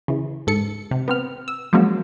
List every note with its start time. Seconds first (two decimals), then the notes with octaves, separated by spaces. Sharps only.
0.08 C#3 E3
0.47 G#2 A4 C#7
0.91 C3
1.08 B3 C4 F6
1.48 E6
1.73 F3 F#3 G#3 A#3 C#4 F#4